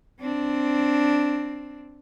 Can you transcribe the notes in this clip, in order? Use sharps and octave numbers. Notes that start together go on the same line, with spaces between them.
C4 D4